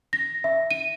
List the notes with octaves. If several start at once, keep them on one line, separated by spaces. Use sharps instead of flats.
A#6
E5
D#7